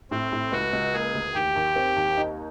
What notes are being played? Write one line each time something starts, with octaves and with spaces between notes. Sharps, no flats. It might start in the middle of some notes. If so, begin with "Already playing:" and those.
A2 C4
A2
C#2 F#4
C#2
A#3 G#4
D2
D#2 G4
D#2
C4
D#2
D#4